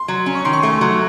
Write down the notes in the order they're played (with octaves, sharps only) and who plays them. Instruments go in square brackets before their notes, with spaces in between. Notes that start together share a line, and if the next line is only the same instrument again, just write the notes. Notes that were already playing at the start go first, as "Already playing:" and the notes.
Already playing: [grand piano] C6
[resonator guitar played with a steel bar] F#3
C#4
[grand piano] C#6
[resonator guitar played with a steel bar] D#3 [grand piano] C6
[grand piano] C#6
[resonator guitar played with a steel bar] A3 [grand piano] C6
[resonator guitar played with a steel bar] F#3